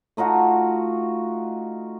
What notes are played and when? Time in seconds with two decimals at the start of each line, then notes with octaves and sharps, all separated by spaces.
0.17 A3 D#4 F4 F#4